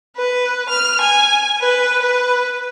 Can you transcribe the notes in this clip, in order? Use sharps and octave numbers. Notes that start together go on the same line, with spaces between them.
B4
F6
G#5
B4
B4